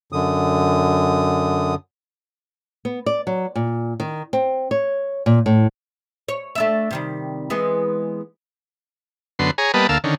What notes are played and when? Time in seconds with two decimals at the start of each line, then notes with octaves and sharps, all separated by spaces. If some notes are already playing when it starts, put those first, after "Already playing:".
0.12 F#2 D3 D#6
2.85 B3
3.06 D5
3.27 F#3
3.55 A#2
4.00 D#3
4.33 C4
4.71 C#5
5.26 A#2
5.46 A2
6.28 C#5
6.55 A3 D4 E5
6.91 C3 D#3 G3
7.50 E3 G#3 B3
9.39 F#2 D3 B3 C6
9.58 G#4 C#5 G#5 A#5
9.74 G3 A#3 B3 B4 D#5 A5
9.89 D2 A#3 F5 A5 E6
10.04 D3 D#3 C#4